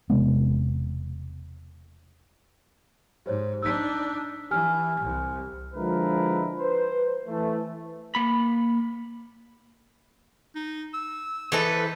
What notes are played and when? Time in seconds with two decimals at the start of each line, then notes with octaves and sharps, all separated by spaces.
0.10 E1 C3 G#3 B3
3.26 G#2 G4 C5 C#5
3.63 D4 D#4 E6 B6
4.51 E3 G4 G#5 F6
5.00 C2
5.74 D3 F3 G#3 E4 A#4 B4
6.60 B4 C5
7.27 E3 A3
8.15 A#3 B5
10.55 D#4
10.94 E6
11.52 E3 A4 B4 D#5
11.74 C5